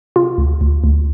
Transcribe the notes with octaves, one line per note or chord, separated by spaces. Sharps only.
C3 F4
D2
D2
D2